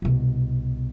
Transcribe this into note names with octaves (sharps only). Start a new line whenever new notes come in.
C2 B2